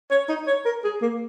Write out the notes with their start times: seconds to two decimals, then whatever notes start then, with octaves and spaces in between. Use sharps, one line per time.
0.11 C#5
0.29 D#4
0.47 C#5
0.65 A#4
0.84 G#4
1.02 A#3